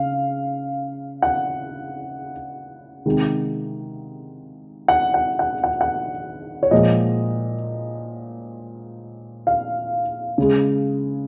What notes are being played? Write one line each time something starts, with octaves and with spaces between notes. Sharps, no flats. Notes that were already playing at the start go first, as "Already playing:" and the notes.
Already playing: C#3 F5
F#5
C3 D#3 G#3
F#5
F#5
F#5
F#5
F#5
C#5
A#2 F3 G#3 D#5
F5
C#3 G#3